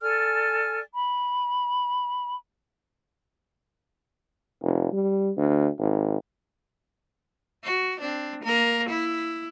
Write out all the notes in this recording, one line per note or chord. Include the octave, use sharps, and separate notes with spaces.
A4 D5 G#5 F6
B5
F1
G3
D2
G#1
F#4
C4 D4
A#3 A#4
E4